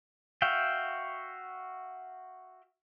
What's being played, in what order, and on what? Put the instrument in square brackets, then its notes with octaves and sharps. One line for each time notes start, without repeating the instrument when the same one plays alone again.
[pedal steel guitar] F#4 E5 F5 G5